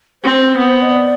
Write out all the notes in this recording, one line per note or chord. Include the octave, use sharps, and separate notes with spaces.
C4 C5
B3
D#5
D5